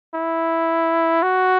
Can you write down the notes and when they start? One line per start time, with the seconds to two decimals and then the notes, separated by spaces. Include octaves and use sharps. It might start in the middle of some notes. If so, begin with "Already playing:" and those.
0.15 E4
1.23 F#4